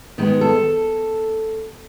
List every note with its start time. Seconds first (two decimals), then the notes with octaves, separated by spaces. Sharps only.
0.18 D#3 G#3 B3 D#4
0.41 A4